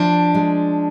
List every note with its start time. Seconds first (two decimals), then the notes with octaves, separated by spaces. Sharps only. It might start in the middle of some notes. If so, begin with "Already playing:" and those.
Already playing: F3 D4
0.35 G#3